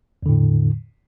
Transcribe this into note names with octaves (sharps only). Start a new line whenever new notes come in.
E2 A2 D3